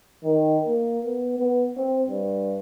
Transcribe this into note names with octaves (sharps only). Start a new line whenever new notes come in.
D#3
A#3
B3
B3
C4
G2